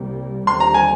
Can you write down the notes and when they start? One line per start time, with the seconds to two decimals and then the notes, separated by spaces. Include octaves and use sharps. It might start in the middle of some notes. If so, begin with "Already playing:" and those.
Already playing: C2 C3 G3 A#3
0.47 D#2 D3 G3 C4 C6
0.60 A#5
0.74 G#5